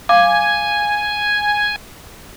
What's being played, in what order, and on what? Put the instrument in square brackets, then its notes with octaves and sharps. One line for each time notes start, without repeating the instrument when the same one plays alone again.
[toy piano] F5 D6 [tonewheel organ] G#5